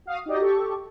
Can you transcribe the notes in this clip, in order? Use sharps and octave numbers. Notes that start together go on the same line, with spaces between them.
F#4 F5 D#6
D#4 F#4 G4 D5 D#5
G4 A4 C#6